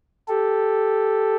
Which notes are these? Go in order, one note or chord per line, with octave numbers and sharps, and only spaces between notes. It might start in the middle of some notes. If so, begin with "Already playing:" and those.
G4 A4